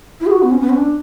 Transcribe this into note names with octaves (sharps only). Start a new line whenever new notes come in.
E4
G#4
F#4
B3
C#4
B3
C#4
D4